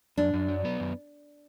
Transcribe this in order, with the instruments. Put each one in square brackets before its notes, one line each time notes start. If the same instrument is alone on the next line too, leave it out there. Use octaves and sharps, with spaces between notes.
[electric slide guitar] F#2 [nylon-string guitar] D4
[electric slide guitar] F#2
F#3
B3
F#2